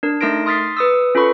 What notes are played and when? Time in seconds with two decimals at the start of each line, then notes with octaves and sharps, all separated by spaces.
0.03 D4 A#4
0.21 A3 D#4 A#4 C6 A#6 D7
0.46 C6 D#6 F6 A6 B6 C7
0.77 B4 D#6 E6
1.15 C#4 F4 A4 B4 B5 C#6